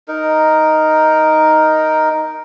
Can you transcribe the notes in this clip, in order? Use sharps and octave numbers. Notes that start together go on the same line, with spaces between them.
D#4 A#4